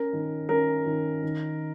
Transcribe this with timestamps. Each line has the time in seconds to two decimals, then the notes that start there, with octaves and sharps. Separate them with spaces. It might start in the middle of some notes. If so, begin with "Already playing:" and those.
Already playing: C#4 A#4
0.13 D#3
0.49 C#4 A#4
0.86 D#3
1.23 D#3